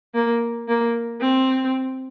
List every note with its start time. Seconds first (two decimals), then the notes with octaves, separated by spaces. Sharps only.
0.15 A#3
0.68 A#3
1.21 C4